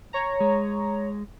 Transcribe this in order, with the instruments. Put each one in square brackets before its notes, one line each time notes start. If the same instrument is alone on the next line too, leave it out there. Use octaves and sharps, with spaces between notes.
[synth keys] C#5 A#5
[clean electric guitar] G#3